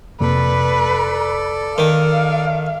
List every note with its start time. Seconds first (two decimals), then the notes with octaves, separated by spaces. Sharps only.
0.20 F2 C3 A#3 A4 B4 D5
1.78 D#3 F5